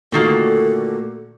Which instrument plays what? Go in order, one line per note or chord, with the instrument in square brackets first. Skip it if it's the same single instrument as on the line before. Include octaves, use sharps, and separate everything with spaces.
[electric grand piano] A#2 A3 F#4 [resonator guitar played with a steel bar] D3 D#3 A#3 [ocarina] A4